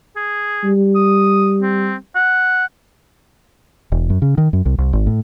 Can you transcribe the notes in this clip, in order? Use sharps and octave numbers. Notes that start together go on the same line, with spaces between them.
G#4
G3
D#6
C4
F#5
E1
F#2
C#3
D#3
F#2
C2
C2
G#1
A2